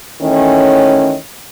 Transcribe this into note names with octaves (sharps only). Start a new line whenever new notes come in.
D#3 E3 A3 C#4